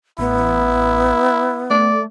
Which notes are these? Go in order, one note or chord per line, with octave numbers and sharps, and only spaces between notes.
A1 B3 E4
A3 D5